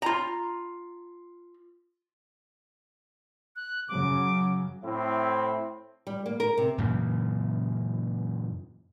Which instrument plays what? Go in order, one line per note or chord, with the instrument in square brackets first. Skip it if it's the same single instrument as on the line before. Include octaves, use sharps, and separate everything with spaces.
[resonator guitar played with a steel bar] F4 A#5
[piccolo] F#6
[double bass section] F#2 C#3 F#3 [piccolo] D6
[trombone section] A2 C4 E4
[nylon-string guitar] G3
A#3
A#4
C3
[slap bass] F#2 A#2 C#3 E3